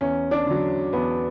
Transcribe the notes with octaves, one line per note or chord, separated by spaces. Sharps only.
E2 C#4
D4
D3 F#3
E2 B3